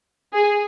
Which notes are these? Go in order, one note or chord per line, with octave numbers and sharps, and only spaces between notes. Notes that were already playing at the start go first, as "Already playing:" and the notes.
G#4